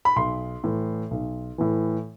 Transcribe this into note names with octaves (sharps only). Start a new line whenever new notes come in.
B5
B1 C6
A2 E3
B1
A2 E3